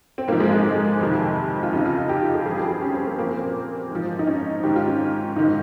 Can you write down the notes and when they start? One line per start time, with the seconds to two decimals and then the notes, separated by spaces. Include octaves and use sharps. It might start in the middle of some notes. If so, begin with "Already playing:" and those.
0.18 C4
0.28 G#2 F3 A#3
0.40 G#3
0.52 G#3
0.65 G#3
1.01 F2 C3 D#3
1.63 F4
1.73 F2 C#3 F3 D#4
1.85 F4
1.98 F4
2.09 G4
2.22 F4
2.34 G#4
2.46 G2 F3 G#4
2.58 G4
2.70 G4
2.82 C#4
2.94 C4
3.06 A#3
3.18 A#2 F3 A#3
3.37 C4
3.91 G#2 F3
4.19 D#4
4.27 C#4
4.63 G#2 D#3 G4
4.76 F4
4.88 C#4
5.36 G#2 D#3 D#4